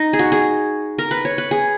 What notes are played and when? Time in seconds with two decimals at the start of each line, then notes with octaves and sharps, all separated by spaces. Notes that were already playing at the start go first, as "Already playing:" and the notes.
Already playing: D#4
0.13 G#4
0.19 F#4
0.32 G#4
0.98 A#4
1.11 B4
1.25 C#5
1.38 B4
1.51 G#4